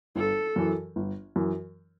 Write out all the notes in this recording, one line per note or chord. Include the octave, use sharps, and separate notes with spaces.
G1 A4
F#2 E3
G1
F#2 E3